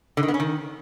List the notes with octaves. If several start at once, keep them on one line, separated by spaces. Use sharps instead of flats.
D3
D#3
B3
C#4
D#3